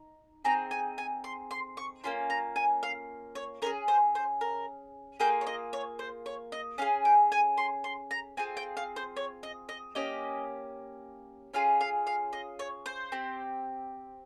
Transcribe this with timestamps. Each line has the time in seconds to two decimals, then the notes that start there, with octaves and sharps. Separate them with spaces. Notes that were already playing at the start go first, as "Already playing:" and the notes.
Already playing: D#4
0.44 C4 D#4 G#4 A#5
0.71 G#5
0.98 G#5
1.24 C6
1.51 C6
1.77 C#6
2.04 A#3 C#4 F4 C6
2.30 A#5
2.56 G#5
2.83 F5
3.35 C#5
3.62 C#4 F4 G#4 A#4
3.88 C5
4.15 C5
4.41 A#4
5.20 A#3 F4 G#4 G5
5.41 C#5
5.47 D#5
5.73 C#5
5.99 C5
6.26 C#5
6.52 D#5
6.78 C#4 G#4 F5
7.05 G5
7.32 G#5
7.58 C6
7.84 C6
8.11 A#5
8.37 C4 F4 G#4 G#5
8.57 G5
8.77 F5
8.96 C5
9.16 C#5
9.43 D#5
9.69 D#5
9.95 A#3 C#4 G4 D#5
11.54 C#4 F4 G#4 F5
11.81 F5
12.07 F5
12.33 D#5
12.59 C#5
12.86 C5
13.12 C4 G4